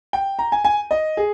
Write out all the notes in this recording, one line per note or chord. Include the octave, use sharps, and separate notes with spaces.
G5
A#5
G#5
G#5
D#5
G#4